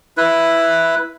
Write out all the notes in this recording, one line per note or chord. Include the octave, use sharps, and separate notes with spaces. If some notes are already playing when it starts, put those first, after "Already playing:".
E4 B4